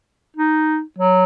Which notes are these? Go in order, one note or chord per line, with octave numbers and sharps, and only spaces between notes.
D#4
F#3